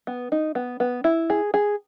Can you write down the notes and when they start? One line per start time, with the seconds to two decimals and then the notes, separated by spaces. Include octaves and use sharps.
0.07 B3
0.32 D#4
0.55 B3
0.80 B3
1.04 E4
1.30 G#4
1.54 G#4